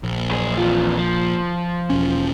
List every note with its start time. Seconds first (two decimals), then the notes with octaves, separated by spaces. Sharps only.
0.03 A#1
0.31 F#2 G#4
0.58 E2 F4
0.98 F3
1.90 E1 C#4